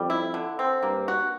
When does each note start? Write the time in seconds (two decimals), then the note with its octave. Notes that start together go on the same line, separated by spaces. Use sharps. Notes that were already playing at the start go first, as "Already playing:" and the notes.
Already playing: F2 G3
0.10 E4
0.34 D3
0.59 C4
0.83 G2 A#3
1.08 F#4